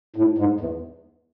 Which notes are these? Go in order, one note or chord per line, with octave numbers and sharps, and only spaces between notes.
A2
G#2
E2